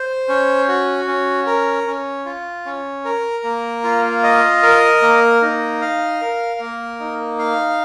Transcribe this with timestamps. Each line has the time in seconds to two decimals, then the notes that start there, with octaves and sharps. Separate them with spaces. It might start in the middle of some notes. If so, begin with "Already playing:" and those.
Already playing: C5
0.29 C#4
0.68 F#4
1.07 C#4
1.46 A#4
1.87 C#4
2.26 F4
2.66 C#4
3.05 A#4
3.44 A#3
3.84 F4
4.23 D#5
4.63 A#4
5.02 A#3
5.42 D#4
5.81 F5
6.21 A#4
6.60 A#3
7.00 D#4
7.39 F5